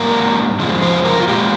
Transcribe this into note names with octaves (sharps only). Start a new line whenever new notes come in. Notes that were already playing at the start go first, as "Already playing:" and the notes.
Already playing: G#2 G3 A#3 A#4
F2 C#3 F3 G#3
C5
A#4
F4
A#2 G#3 G4